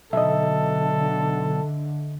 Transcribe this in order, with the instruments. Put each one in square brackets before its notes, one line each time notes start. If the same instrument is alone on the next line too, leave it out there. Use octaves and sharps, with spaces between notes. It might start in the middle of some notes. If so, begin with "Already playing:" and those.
[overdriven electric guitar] B1 [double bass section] D3 [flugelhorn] A4 [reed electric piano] D#5 E5